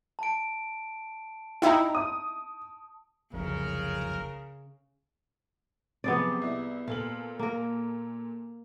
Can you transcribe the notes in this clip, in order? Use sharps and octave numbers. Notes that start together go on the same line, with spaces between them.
A5 D7
D#4 E4 G5 A#5
D#6
F#1 C2 F2 C#3 A#4
C3 F3 F#3 B3 G#4 D5
C2 E4
A#2 A4 F5 F#7
A#3 A#4